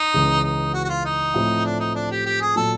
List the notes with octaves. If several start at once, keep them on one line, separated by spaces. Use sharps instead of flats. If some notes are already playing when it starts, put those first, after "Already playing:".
Already playing: D#4
C#2 C#3 E3
D#4
F#4
F#4
F4
D#4
A2 F3 A3 C4
D4
D#4
D4
G4
G4
G#4
A#2 F#3 A4